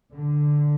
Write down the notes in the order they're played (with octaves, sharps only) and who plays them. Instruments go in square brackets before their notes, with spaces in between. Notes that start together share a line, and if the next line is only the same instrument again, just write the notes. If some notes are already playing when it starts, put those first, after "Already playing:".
[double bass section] D3